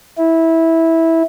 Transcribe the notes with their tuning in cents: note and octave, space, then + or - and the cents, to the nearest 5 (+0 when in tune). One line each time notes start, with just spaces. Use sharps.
E4 -15